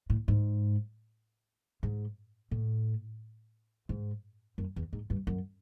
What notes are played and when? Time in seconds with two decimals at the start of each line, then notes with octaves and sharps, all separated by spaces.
0.10 A2
0.28 G#2
1.83 G#2
2.51 A2
3.89 G#2
4.58 F#2
4.76 E2
4.93 G#2
5.10 G2
5.27 F#2